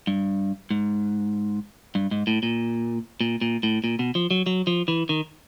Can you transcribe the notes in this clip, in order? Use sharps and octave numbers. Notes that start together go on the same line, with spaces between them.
G2
G#2
G2
G#2
A2
A#2
A#2
A#2
A2
A#2
B2
F3
F#3
F#3
F3
E3
D#3